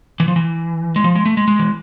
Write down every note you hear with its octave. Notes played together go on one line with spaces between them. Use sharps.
E3
F3
E3
G#3
F3
G#3
A3
G#3
G#3
E3